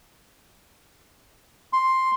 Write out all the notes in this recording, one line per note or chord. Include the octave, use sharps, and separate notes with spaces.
C6